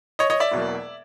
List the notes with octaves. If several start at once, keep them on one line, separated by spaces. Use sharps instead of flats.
C#5 D#5
C#5 D#5
D5 E5
E1 E2 B2 F#3 A#3